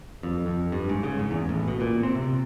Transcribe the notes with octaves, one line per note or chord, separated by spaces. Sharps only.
F2
F2
G2
G#2
C#3
G#2
E2
A1
B2
A#2
C4
C3